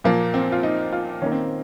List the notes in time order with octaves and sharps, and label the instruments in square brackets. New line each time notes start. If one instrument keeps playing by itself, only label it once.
[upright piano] A#2 F3 A#3
C4
F4
D#4
F4
D#3 C#4
A#3
C4